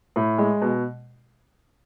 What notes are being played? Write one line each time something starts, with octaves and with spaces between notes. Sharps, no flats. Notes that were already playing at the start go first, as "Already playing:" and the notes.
A2
G#3
B2